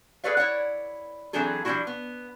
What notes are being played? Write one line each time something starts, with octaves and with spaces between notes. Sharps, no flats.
G#4 A4 B4 C#5 D5 F5
E4 C#5 D5 F#5
E3 F#3 C4 D4 G#4 A4
F3 G3 C4 D4 E4 F#4
B3